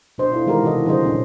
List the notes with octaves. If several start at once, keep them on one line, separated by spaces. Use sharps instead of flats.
B2 D4 C5 D#5
E4 F4 A4
D#3 E3 G#3 F#4 G4 A#4
C3 E3 F#4 A4 D#5
D3 F3 G3 G#4 C5 D#5
A#2 C#4 D4